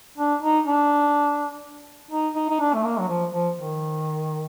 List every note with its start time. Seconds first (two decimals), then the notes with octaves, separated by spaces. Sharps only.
0.18 D4
0.42 D#4
0.66 D4
2.11 D#4
2.35 D#4
2.50 D#4
2.60 D4
2.74 A3
2.84 A#3
2.99 F#3
3.08 F3
3.32 F3
3.56 D#3